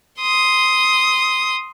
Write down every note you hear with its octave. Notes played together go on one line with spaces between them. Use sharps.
C6 D#6